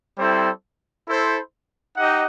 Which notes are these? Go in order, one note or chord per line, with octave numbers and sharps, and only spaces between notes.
G3 C4 E4 A4 C5
E4 A4 C5
D#4 G4 D#5 F#5